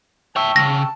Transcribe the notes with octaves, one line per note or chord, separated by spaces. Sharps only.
C#5 E5 G5 A5 C#6 E6
C#2 C#3 A#6